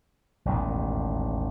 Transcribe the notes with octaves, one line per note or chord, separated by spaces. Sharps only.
E1 A1 D#2 D#3